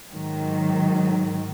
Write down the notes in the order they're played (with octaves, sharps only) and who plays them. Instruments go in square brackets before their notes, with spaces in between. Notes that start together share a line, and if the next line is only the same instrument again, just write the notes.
[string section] G#2 D#3 F#3